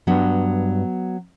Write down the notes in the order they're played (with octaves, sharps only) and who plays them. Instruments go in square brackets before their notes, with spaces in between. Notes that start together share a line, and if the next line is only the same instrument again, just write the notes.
[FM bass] G2 [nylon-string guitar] F#3 B3